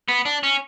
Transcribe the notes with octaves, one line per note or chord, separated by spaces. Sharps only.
B3
D4
C#4